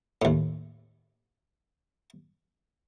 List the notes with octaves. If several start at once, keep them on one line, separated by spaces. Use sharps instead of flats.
D#2 A2